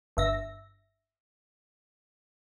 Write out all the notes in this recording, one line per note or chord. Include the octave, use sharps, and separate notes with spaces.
G1 E5 A#6